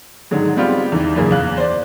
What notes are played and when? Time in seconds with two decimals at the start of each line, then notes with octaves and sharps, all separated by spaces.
0.31 G#2 D3 D#3 F#3 G#3
0.56 G3 G#3 B3 C4 F4 G4
0.92 E2 D#3 E3
1.16 F#2 A#2 C#3 A#3 G#4
1.31 E2 F5 F#6
1.57 C5 D5